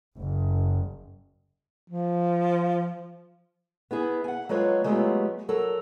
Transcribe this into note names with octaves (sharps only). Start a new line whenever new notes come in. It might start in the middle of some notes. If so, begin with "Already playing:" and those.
F#1
F3
B3 E4 G#4
F#5 G#5
F#3 G#3 F4 A4 B4 C#5
F#3 G#3 A3 B3 F4 G4
F#3 A4 A#4